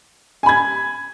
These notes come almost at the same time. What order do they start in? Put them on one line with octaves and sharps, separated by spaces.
G#5 B5 G#6